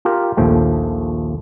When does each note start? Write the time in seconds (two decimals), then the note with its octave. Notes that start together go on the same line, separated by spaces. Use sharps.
0.05 F4 G4 A#4
0.37 A#1 D#2 F3 A3 G5